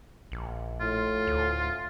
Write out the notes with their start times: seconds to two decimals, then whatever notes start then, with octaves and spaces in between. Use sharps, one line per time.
0.32 A#1
0.80 A2 F4
1.27 D2